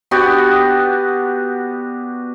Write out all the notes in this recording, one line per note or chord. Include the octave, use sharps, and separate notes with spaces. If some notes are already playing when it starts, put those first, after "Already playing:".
B3 D4 F#4 G4